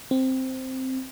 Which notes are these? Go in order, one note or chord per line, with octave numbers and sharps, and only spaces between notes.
C4